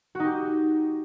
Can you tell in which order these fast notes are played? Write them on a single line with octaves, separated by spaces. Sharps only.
F#4 D#4 G4